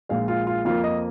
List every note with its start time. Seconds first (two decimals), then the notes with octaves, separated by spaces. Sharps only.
0.09 A#1 A#2 G#3 F5
0.28 F4
0.47 F4
0.65 F2 F3 A#3 F4
0.84 D#5